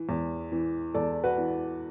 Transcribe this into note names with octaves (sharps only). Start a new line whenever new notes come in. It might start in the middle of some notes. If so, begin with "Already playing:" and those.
Already playing: E3
E2
E3
E2 A4 D5
F#4 B4
E3